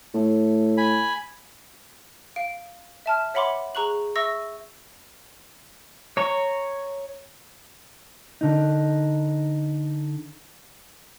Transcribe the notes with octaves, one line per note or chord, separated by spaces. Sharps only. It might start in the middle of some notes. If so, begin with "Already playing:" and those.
A2
G#5 B5
F5 D7
E5 A5 F6
C#5 E5 F#5 B5 C6 D6
G#4 A#5 C#6 F#6 F#7
E5 C#6 E6 A#6
C#5 A#5 C#6
D3 D#4